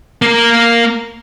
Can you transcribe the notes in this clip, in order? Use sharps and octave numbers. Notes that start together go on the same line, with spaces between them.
A#3 A#4